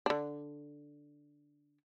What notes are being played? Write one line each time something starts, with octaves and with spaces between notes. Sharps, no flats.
D3 D4